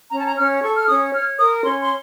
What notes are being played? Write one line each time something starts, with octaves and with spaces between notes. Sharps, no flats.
C#4 A#5
A5
A#5
C#4 F6
A4 C#6
F6
C#4 D#6
C#5 F6
A#4 D#6
C#4 C6
C6